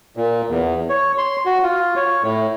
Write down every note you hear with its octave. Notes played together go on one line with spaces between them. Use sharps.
A#2
E2
C#5
C6
F#4
F4
C#5
A2